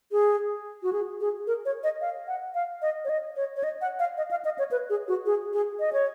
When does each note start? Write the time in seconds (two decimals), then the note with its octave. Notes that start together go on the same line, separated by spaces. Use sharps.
0.12 G#4
0.83 F#4
0.93 G#4
1.20 G#4
1.47 A#4
1.65 C#5
1.84 D#5
2.01 F5
2.28 F#5
2.55 F5
2.82 D#5
3.05 C#5
3.09 D#5
3.36 C#5
3.56 C#5
3.64 D#5
3.81 F#5
3.99 F5
4.17 D#5
4.31 F5
4.45 D#5
4.59 C#5
4.71 B4
4.90 G#4
5.08 F#4
5.26 G#4
5.53 G#4
5.80 D#5
5.93 C#5